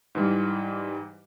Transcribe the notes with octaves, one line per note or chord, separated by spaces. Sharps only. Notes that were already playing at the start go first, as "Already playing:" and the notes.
G#2 E3 G3